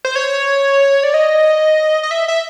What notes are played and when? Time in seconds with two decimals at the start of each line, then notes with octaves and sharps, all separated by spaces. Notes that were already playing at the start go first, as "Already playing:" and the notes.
0.05 C5
0.16 C#5
1.03 D5
1.14 D#5
2.03 D#5
2.11 E5
2.28 E5